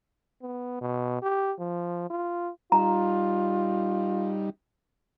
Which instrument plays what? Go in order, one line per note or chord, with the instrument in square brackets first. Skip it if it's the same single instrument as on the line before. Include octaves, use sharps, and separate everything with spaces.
[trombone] B3
B2
G4
F3
F4
[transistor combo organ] G3 D#4 [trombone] F4 [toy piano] A#5